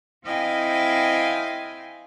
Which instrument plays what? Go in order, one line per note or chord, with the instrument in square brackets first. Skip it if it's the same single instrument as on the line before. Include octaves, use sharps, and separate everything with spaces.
[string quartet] C4 E4 D#5 F5 G5 G#5